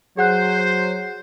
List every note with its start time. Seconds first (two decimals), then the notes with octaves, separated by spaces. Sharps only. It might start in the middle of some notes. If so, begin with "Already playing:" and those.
0.17 F#3 G#4 C5 F#5 F#6